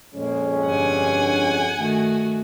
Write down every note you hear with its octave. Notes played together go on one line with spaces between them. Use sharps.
F2 A#2 G#3 A#3 C#4
G2 D3 F#5 G#5
D#3 A3 F#4